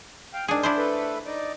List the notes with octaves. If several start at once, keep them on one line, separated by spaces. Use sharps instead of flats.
F5 G5
G#2 D#3 D4 G#4
D4 E4 C5
A3 A4 B4
D#4 D5